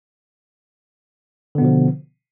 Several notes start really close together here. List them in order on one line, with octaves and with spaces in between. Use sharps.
D3 B3 B2 F3